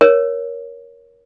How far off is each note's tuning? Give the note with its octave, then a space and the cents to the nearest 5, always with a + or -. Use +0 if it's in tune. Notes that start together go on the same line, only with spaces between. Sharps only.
A#4 +20 C#5 +10